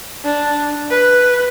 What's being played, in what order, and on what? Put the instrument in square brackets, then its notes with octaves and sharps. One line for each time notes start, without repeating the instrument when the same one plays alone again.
[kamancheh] D4
B4